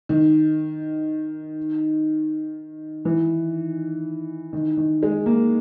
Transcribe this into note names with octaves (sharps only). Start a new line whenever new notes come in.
D#3
E3
D#3
D#3
G#3
A#3